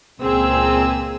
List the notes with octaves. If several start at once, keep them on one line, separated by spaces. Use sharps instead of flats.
C#2 A#2 C4 G#4 E6